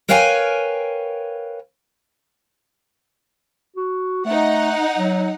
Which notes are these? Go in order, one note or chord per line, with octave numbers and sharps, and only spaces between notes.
A#4 B4 C#5 F5 G5 G#5
F#4
A3 D#4 F#5
F#3